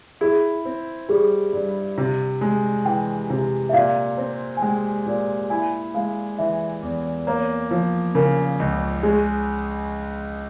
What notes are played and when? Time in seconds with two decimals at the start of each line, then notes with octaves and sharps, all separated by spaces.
0.21 E4 G#4
0.65 C4
1.09 G3 G#4
1.53 G2
1.98 C3
2.41 G#3
2.85 E3 G5
3.30 C3
3.69 E5
3.73 A#2 F5
4.18 C4
4.57 G#5
4.62 G#3 G5
5.06 A#2
5.50 E4 G#5
5.94 G#3 F5
6.38 E3 E5
6.83 E2
7.27 A#3 C#5
7.71 F3
8.15 C#3 A#4
8.60 C#2
9.03 G#3 G#4